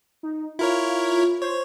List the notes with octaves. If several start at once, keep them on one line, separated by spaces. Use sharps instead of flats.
D#4
E4 F4 A#4 C#5
C5 C#5